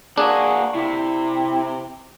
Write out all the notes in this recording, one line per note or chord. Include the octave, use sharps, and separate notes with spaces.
A#3 D4 F#4 G#4
C3 E4